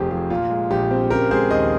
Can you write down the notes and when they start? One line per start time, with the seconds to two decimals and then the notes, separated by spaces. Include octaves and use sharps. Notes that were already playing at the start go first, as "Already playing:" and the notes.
Already playing: F1 F2 C3 G4 G#4 C5
0.10 F3 G4
0.30 A#2 F4
0.50 G#3
0.71 A#1 G4
0.91 C4
1.10 C#3 G4 A#4
1.31 G#3 G#4 C5
1.51 D#2 C5 D#5